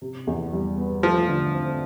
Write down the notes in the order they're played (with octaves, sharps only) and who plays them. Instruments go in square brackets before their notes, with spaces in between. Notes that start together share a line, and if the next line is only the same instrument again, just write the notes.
[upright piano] C3
E2
G3
B3
[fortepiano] F3 [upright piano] A3
[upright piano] D3
C4